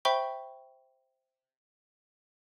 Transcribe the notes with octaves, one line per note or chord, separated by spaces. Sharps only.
C5 E5 G5 B5 C#6 G7